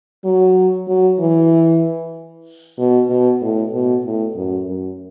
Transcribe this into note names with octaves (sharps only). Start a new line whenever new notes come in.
F#3
F#3
E3
B2
B2
A2
B2
A2
F#2
F#2